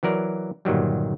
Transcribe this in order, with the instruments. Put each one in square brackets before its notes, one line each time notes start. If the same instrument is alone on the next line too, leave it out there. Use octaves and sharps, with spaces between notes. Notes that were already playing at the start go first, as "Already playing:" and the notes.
[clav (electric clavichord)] E3 F#3 A#4 D5
G1 A#2 D#3 F#3 G3